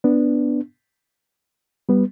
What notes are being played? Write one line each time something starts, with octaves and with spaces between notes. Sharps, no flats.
B3 D4
G3 B3